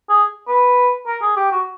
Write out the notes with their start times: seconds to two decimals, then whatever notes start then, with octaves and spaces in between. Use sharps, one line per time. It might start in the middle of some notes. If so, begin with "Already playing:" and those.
0.09 G#4
0.48 B4
1.07 A#4
1.22 G#4
1.37 G4
1.52 F#4